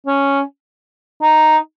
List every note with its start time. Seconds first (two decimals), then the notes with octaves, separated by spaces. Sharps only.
0.07 C#4
1.22 D#4